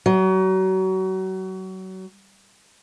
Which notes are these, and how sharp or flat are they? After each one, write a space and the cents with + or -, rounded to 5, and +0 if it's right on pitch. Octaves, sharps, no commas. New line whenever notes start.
F#3 +30